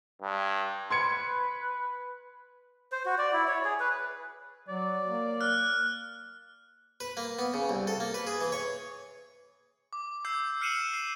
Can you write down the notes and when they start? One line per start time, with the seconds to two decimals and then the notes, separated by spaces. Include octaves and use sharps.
0.22 G2
0.90 B4 C6 G#6 C#7
2.92 C5
3.05 F#4
3.18 D5
3.33 E4
3.47 C#5
3.65 G#4
3.80 B4
4.68 F#3 D5
5.07 A#3
5.41 F6 F#6
7.00 B4
7.17 A#3
7.39 B3
7.54 C#3
7.69 C2
7.87 A4
8.00 A#3
8.14 B4
8.27 G#4
8.41 E3
8.52 C#5
9.93 D6
10.25 D6 E6 G6 C7
10.61 F6 C7 C#7 D#7 E7 F#7
10.94 C7